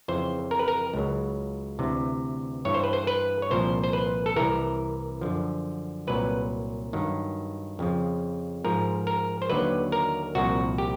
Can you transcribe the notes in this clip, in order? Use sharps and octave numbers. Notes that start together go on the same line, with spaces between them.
F2 C#3 E3 C5
A#4
B4
A#4
C#2 C#3 F#3
D2 C3 E3
G2 E3 C#5
C5
B4
C5
B4
C#5
C2 A#2 F3 C5
C5
B4
A4
C2 C3 E3 A#4
F#2 D3 F3
C2 A#2 F#3 B4
G2 D#3 F#3
F2 C#3 F3
G#2 F3 A#4
A#4
C5
D#2 D3 F#3 B4
A#4
C2 A#2 F3 F#4
G4